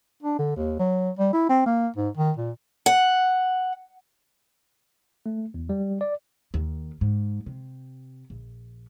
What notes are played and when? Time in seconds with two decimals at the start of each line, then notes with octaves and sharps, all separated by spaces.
0.22 D4
0.39 D3
0.56 D#2
0.79 F#3
1.19 G3
1.33 E4
1.49 C4
1.66 A#3
1.96 G#2
2.17 D#3
2.37 A#2
2.86 F#5
5.26 A3
5.54 E2
5.69 G3
6.01 D5
6.54 D#2
7.01 G#2
7.46 C3
8.30 A#1